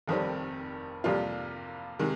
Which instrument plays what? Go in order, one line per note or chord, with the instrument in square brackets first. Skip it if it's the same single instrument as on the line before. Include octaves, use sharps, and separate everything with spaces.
[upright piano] F1 F2 D#3 G3 C4
F2 C3 G3 A#3 F4
C3 D#3 G#3